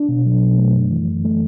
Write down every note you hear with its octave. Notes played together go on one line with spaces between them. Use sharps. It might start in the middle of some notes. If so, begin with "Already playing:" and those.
Already playing: D4
B2
F#3
B2
A3
F#2
E3
F#2
A3